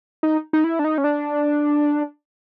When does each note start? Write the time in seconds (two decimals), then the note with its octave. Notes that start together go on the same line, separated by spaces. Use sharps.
0.23 D#4
0.53 D#4
0.64 E4
0.79 D4
0.84 D#4
0.98 C#4
1.04 D4